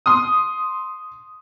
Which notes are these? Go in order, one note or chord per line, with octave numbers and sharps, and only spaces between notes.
C6 D#6